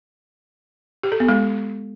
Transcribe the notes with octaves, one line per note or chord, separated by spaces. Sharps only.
G4
A4
B3
G#3